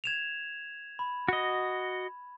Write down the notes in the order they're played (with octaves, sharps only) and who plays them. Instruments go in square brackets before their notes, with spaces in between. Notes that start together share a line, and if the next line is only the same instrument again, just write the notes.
[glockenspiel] G#6 E7 F7
B5
[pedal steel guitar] F#4 D#5